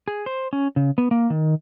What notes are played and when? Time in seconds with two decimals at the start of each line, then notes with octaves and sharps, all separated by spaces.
0.08 G#4
0.26 C5
0.53 C#4
0.76 C#3
0.98 B3
1.11 A#3
1.30 D#3